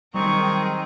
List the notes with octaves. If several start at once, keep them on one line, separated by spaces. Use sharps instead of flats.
D#3 F#3 G3 C4 D#4 G#4 A#4 C#6